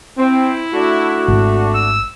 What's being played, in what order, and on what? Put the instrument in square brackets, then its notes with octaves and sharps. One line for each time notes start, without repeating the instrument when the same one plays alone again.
[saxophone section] C4 [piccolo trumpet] E4
[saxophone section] A3 D4 F#4
[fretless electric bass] G#1
[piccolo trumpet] E6